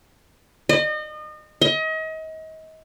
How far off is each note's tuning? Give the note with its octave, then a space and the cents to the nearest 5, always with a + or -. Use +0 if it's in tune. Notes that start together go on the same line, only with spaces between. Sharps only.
D#5 -35
D#5 +35